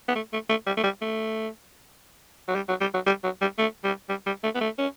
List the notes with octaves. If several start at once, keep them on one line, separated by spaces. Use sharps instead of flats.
B3
A3
A3
A3
G3
A3
G3
A3
F#3
G3
F#3
G3
F#3
G3
F#3
G3
A3
G3
G3
G3
A3
B3
A3
C#4